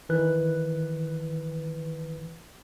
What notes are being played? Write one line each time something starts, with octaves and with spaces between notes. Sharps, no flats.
D#3 E3 B4 F#6